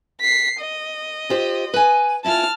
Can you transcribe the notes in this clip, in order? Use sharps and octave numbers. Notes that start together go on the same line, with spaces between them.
B6 C7
D#5
F4 G4 C5
B4 G#5
C#4 E4 F4 A5 F6